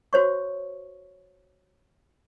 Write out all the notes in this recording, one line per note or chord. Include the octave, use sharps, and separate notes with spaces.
F#4 C5 C#5 C#6